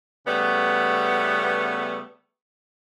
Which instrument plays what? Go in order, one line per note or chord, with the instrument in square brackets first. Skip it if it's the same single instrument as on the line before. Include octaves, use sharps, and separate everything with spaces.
[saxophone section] C#3 G3 A3 B3